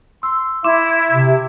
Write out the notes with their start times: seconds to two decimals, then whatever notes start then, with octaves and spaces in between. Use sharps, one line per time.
0.23 C6 E6
0.64 E4 E5 C6 D6 E7
1.12 C3